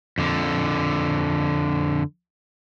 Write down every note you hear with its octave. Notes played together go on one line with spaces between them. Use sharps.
F2 D3